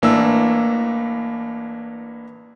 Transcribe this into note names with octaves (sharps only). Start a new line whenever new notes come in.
A1 E3 A#3 D4 E5 E6